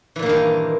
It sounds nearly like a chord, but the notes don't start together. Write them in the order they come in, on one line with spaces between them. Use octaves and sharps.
E3 A#2 A#3 G2 D#3